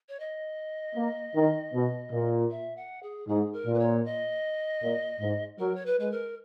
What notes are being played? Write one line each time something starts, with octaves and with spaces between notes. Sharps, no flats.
C#5
D#5
A#3
D#3
B2
A#2
E5
F#5
G#4
G#2 G#4
A#4
A#2
B4
C#5
D#5
A#2
G#2
F#3 A#4
C#5
B4
G#3 B4
A#4